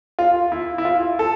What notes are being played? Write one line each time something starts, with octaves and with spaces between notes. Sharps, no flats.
F4
E4
E4
F4
A4